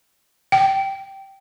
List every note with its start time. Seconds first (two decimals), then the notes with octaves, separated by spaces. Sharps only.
0.52 G5